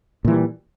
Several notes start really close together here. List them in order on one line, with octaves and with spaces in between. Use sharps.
A#2 E3 G3